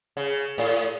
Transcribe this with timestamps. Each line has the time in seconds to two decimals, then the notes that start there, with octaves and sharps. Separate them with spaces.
0.17 C#3
0.58 A2